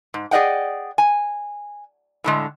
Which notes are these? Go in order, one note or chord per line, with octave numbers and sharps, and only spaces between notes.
G#2
G#4 D5 D#5 F#5 G5
G#5
A2 D3 G#3